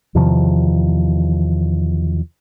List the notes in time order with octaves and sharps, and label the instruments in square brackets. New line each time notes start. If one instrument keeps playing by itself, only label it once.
[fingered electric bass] E2 C3 D#3 F3